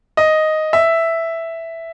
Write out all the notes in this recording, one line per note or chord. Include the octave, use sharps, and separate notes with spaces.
D#5
E5